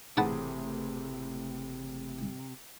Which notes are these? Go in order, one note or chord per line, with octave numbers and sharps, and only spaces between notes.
F#1 A2 C3 E3 G#4 F#5 A5 B5